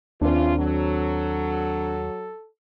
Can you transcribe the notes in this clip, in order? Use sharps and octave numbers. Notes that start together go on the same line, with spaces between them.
D#2 C#3 E3 C4 D4 F4
F#3 A4